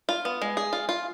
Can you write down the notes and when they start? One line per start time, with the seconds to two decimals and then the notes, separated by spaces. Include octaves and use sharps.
0.09 F4
0.25 B3
0.42 G#3
0.57 G#4
0.73 F4
0.89 F4